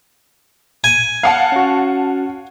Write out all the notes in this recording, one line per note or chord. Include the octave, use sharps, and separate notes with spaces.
G#5
F5 F#5 A5
C#4 F#4